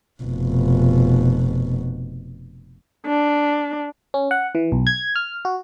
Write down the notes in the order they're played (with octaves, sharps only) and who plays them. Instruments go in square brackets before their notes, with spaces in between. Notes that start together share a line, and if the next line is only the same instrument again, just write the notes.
[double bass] F1 B2
[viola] D4
[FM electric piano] C#4
F#5
E3
B1
G#6
F6
F#4